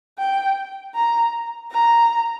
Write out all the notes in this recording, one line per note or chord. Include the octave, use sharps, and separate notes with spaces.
G5
A#5
A#5